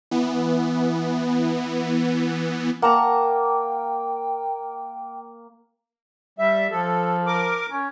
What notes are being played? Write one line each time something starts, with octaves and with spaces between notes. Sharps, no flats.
E3 B3
A#3 F#5 G5 A5 A#5
G3 E5
F3 A4
A#4 D6
C#4